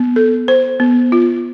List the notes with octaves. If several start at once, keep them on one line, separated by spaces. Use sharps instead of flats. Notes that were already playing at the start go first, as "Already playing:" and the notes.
Already playing: B3
A4
C5
B3
F4